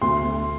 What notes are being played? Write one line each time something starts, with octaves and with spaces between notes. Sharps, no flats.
D2 C6
D2